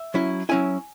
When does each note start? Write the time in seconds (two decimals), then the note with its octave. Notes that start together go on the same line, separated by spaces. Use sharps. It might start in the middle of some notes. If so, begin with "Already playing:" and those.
Already playing: E5
0.14 F#3 C#4 E4
0.49 F#3 C#4 E4 G#5